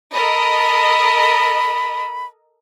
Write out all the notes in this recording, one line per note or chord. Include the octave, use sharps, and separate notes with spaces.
A4 A#4 D#5 B5